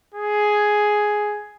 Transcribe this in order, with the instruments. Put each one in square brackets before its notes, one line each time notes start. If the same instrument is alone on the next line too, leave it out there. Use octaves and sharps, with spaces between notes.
[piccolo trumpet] G#4